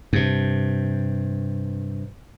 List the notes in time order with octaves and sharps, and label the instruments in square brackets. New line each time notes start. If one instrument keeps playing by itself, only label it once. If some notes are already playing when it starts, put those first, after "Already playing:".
[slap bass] G2 C3